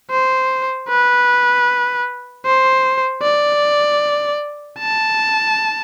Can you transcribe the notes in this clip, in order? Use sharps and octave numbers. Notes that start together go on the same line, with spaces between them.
C5
B4
C5
D5
A5